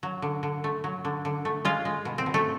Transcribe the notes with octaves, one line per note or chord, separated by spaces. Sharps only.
F#3
D3
D3
A3
F#3
D3
D3
A3
G#3 F4
G#3
B2
C4
B2
A3